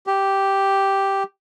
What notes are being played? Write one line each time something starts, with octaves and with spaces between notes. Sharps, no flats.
G4